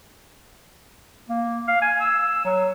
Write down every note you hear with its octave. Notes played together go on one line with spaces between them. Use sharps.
A#3
F5
G#5
E6
F#3